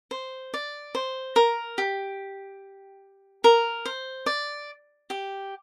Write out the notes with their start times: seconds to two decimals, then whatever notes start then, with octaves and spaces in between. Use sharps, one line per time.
0.11 C5
0.54 D5
0.95 C5
1.36 A#4
1.78 G4
3.44 A#4
3.85 C5
4.26 D5
5.10 G4